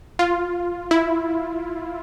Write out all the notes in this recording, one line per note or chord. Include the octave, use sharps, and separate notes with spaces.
F4
E4